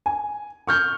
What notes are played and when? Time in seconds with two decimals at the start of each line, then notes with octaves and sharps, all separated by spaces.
0.06 G#5
0.67 C#6 F6 G6